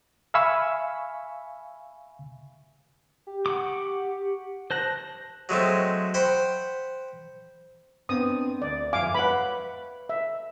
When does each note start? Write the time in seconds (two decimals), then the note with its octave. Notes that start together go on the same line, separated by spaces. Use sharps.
0.34 E5 F5 G#5 B5 C#6 E6
3.27 G4
3.46 F#5 C#6 D6
4.71 C5 A5 F#6 A#6
5.49 F#3 G#3 A3 C4
6.14 C5 F#5 G5 B5 C6
8.09 B3 C4 D4 D#6
8.62 D2 D5
8.93 F2 E5 F5 G#5 D6
9.15 B4 C#5 F#5 B5
10.09 E5